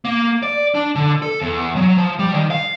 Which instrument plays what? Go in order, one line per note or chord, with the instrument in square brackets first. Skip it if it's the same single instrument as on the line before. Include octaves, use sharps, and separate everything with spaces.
[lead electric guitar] A#3
D5
D4
D3
A4
E2
F#3
F3
G3
D#3
F5